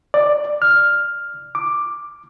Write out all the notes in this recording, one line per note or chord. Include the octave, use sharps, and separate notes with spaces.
D5
F6
D6